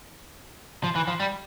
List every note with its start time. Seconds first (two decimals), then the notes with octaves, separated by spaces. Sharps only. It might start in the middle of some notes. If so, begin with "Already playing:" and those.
0.84 F3
0.96 E3
1.07 F3
1.20 G3